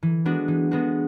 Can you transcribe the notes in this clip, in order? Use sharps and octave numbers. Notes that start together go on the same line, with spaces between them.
E3
G#3 B3 D4 F#4
E3
G#3 B3 D4 F#4